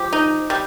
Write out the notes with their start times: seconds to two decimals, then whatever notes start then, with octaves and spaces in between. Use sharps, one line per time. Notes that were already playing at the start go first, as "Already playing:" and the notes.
Already playing: F3 G4
0.13 D#4
0.50 G3